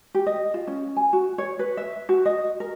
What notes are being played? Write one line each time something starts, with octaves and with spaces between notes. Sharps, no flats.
G4
D#5
F4
C#4
G#5
F#4
C#5
B4
E5
F#4
D#5
A#4